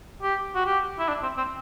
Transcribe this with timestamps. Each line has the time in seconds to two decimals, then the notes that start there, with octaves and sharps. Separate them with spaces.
0.22 G4
0.55 F#4
0.66 G4
0.99 E4
1.09 D4
1.23 C4
1.37 C4